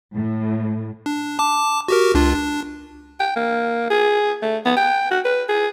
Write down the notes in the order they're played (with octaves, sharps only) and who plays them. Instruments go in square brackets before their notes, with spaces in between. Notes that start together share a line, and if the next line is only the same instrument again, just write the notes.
[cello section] A2
[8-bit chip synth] D4
A5 D6
F#4 G4 A#4
C#2 D4 F4
D4
[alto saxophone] G5
A#3
G#4
A3
B3
G5
F#4
B4
G#4